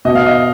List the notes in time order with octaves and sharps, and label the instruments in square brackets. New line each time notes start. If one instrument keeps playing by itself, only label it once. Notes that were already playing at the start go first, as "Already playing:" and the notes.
[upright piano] B2 [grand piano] D#5
[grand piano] F5
D#5